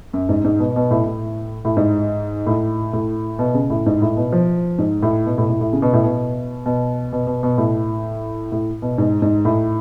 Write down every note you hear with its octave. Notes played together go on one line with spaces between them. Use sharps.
F#2
G#2
G#2
B2
B2
A2
A2
A2
G#2
A2
A2
B2
C#3
A2
G#2
A2
B2
F3
G#2
A2
B2
A2
A2
A2
C#3
B2
A2
B2
B2
B2
B2
B2
A2
A2
B2
G#2
G#2
A2